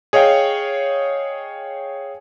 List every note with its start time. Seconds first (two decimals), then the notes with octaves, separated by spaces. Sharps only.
0.13 G#4 C#5 D#5 F5 G5